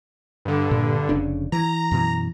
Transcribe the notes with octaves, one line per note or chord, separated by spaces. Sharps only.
G2 D3
A#2
F1 C#3 D4
E3 A#5
F#2 B2 E3